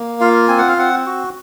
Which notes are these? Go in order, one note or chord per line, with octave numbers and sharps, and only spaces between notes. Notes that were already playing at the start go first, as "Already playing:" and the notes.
Already playing: A#3
F4 F5
C4 G#5
F#5
F5
C4 F#5
F#4